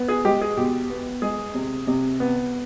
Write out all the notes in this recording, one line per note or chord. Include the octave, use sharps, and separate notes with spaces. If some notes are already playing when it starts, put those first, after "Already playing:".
Already playing: B3
G#4
G#3 G4
G#4
B2 G4
B3
G#3 G#4
C3
C3
B3